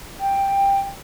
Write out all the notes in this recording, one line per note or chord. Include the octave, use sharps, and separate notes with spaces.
G5